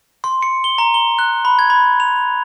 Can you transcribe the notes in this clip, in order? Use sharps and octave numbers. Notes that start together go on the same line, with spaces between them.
C6
C#7
G7
A#5
G7
F#6
B5
G#6
B5
F7